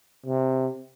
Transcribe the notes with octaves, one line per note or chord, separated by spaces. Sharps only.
C3